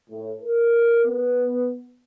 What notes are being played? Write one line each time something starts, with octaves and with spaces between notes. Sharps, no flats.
A2
A#4
B3